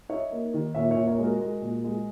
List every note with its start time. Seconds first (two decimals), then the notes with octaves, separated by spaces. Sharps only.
0.09 D#4 C#5 E5
0.31 A#3
0.54 D#3
0.75 A#2 C#5 E5
0.91 C#5 E5
0.96 A#2
1.07 A#4 C#5
1.18 G#3
1.24 F#4 A#4
1.40 G#3
1.61 A#2
1.84 G#3